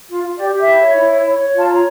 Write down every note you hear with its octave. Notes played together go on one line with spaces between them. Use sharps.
F4
F4
G4 D5
G4
E5
E4
C#5
E4
C#5
C#5
C#5
F4 A5
C#5 A#5